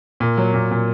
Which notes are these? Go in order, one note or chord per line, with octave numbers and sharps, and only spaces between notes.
A#2
F#3
A#2
A#2